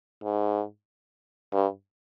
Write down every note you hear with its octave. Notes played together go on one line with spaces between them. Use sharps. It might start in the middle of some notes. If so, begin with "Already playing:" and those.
G#2
G2